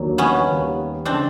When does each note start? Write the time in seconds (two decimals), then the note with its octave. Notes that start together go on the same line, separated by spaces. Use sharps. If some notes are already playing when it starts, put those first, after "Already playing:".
Already playing: D#2 D#3 F#3 A#3 D4
0.18 B3 C#4
0.47 D#2 D#3 G3
1.05 C#3 E3 C4 D4